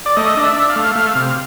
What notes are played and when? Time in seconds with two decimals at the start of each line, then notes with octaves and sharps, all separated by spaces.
0.06 D5
0.17 A3 D#5
0.37 D4
0.43 E5
0.56 D4
0.69 F5
0.76 A3
0.95 A3 F5
1.15 C3